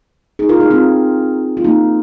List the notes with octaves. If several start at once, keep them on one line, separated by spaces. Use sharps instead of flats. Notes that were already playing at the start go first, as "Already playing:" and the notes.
D#4 G#4
F4 A#4
D#4 G#4
C4 F4
F4
A#3 D#4